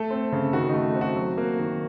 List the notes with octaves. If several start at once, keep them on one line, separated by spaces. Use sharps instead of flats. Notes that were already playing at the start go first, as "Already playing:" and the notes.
Already playing: A3 A4
C4
C#3
D#3 F#4
A3 D#4
C4
F#4
F#3
A#3
D#3